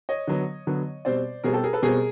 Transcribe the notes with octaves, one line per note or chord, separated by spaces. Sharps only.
C#5 D#5
D3 F#3 B3
D3 F#3 B3
B2 G3 C4 C5 D5
B2 G3 C4 G#4 A#4
G4 A4
G#4 A#4
A4 B4
B2 G3 C4 G#4 A#4